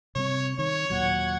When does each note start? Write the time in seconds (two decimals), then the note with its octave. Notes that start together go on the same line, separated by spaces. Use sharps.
0.15 C3 G3 C4 C#5
0.59 D#3 C#5
0.90 D#2 A#2 F#3 F#5 G#6